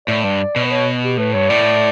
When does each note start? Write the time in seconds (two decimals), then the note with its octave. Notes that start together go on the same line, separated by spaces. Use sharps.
0.08 A2 D5
0.23 G2 D5
0.56 B2
0.65 B4
0.71 C#5
1.02 G4
1.18 A2 B4
1.34 G2 C#5
1.50 A2 D5